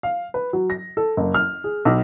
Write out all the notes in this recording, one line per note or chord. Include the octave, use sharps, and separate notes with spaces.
F5
B4
F#3
A#6
A4
F#1
F6
G#4
B1